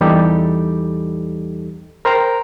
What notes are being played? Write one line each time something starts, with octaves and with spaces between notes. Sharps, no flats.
E2 E3 G3 D#4 G4 A4
A#4 C5 G5 A#5